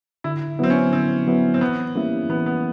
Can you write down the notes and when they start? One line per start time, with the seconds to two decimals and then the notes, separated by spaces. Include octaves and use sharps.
0.24 D3 E4
0.59 F#3 B3 C4 E4
0.70 C#4
0.93 D3 C4
1.27 F#3 B3 E4
1.54 C4
1.61 E3 B3
1.96 G3 A#3 C#4 E4
2.29 E3 B3
2.46 B3